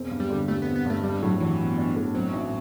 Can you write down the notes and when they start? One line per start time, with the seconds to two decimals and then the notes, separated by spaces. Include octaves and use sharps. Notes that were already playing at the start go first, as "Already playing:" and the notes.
Already playing: E1 C4
0.11 G2
0.20 G3
0.30 D3
0.48 G3 A3
0.62 B3
0.67 C4
0.76 B3
0.85 G2 A3
1.04 G3 D4
1.22 A2 F#3
1.40 E3 F#3
1.59 B3
1.78 D4
1.96 A2
2.15 F#3 C4
2.33 A1